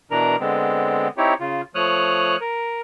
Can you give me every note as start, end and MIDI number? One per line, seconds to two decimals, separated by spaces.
0.11 0.36 47
0.11 0.36 52
0.11 0.36 62
0.11 0.36 70
0.11 0.36 82
0.40 1.08 50
0.40 1.08 56
0.40 1.08 59
0.40 1.08 60
1.18 1.34 60
1.18 1.34 63
1.18 1.34 64
1.18 1.34 67
1.18 1.34 73
1.40 1.61 49
1.40 1.61 65
1.75 2.36 53
1.75 2.36 57
1.75 2.36 73
1.75 2.36 87
1.75 2.36 89
1.75 2.36 90
2.41 2.81 70